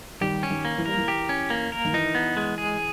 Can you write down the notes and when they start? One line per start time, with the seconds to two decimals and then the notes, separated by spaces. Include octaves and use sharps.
0.21 D#3 G3 G4
0.43 C#4
0.50 D#3
0.65 A#3
0.78 E3
0.86 G3 A#4
0.97 E3
1.08 G4
1.29 C#4
1.50 A#3
1.72 A#4
1.85 D#3
1.93 E3 D#4
2.15 B3
2.37 G#3
2.58 G#4